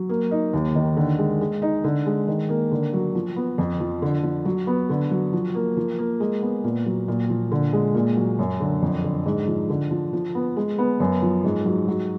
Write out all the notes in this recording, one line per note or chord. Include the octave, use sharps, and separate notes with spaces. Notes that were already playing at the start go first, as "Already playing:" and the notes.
Already playing: F#3
A#3
D#4
D#2
D#3
D3
G#3
G#3
D#4
D3
G#3
D#3
A#3
D3
F#3
F3
B3
F2
F3
D3
F3
F#3
B3
D3
F#3
F3
A#3
F3
A#3
G#3
B3
A#2
F#3
A#2
F3
D3
G#3
A#2
F#3
F#2
D3
F2
D3
G#2
F3
D3
F3
F3
B3
G#3
B3
F#2
F3
G#2
F#3
F#3